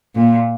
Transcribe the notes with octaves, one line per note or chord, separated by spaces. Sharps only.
A#2